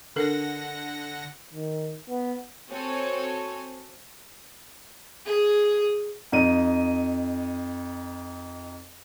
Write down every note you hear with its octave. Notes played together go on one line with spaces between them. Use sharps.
D3 D4 A4 A#4 F#5 A#6
D#3
B3
C4 F#4 A4 C#5 G#5
G#4
F2 D#4 D#7